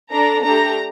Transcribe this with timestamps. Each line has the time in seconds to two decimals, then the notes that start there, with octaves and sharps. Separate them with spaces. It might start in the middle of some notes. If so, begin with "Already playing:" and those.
0.12 D4 A4 A#5
0.43 A3 D4 G4 A#5